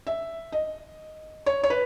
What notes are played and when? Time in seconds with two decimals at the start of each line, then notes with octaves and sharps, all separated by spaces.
0.07 E5
0.52 D#5
1.46 C#5
1.63 C#5
1.70 B4